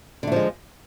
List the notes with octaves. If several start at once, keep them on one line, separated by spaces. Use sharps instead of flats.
D3 F3 G#3 A3